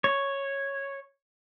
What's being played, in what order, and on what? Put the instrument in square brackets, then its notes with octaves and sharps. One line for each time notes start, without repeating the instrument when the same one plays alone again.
[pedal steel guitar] C#5